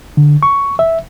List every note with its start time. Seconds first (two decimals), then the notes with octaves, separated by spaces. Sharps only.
0.17 D3
0.43 C#6
0.79 E5